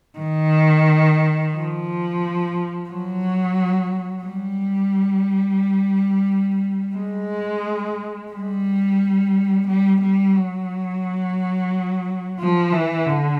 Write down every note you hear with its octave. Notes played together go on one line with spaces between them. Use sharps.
D#3
F3
F#3
G3
G#3
G3
G3
G3
F#3
F3
E3
D3